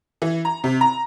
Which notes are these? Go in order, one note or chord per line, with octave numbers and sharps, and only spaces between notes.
E3
A#5
C3
A#5